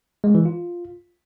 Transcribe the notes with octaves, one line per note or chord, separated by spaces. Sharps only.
G#3
E3
F4